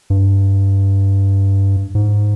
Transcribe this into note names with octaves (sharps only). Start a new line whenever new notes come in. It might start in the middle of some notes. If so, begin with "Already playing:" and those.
G2
G#2